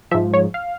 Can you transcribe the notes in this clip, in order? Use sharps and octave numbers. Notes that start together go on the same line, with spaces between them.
G#2 F3 E5
C#5
F5